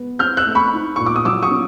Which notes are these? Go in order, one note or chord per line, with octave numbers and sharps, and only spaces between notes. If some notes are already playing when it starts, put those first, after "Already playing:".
Already playing: B3
C4 F6 G6
E6 F#6
A3
B5 C#6
D#4
A#2 C#6
D6
D#6
F#3 D6 E6
C#6 D#6
C#4